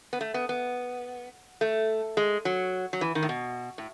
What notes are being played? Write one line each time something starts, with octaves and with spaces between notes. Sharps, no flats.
B3
A3
B3
B3
A3
G#3
F#3
F#3
E3
D#3
A2
B2
A2